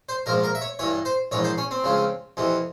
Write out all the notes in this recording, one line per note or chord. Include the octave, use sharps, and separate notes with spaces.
C5
A#1 G#2 F3 A#4
A#4
E5
C#5
G2 E3 C#5
C5
A#1 G#2 E3 C#5
C5
C#4
C4
C#2 C#3 F3
F2 C3 E3